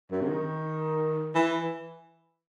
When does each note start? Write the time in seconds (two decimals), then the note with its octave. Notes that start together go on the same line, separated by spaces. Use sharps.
0.11 F#2
0.21 C3
0.28 D#3
1.35 E3